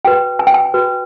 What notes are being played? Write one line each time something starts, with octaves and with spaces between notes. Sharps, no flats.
F#4 B4 G5
G#5
G5
G#5
F#4 B4